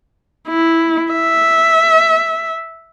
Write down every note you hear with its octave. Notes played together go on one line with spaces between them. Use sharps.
E4
E5